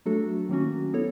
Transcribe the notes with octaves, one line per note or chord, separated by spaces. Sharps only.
F#3 A3 D4 F#4 A4
D#3 F#3 A#3 C#4 F#4
B3 E4 A4 C#5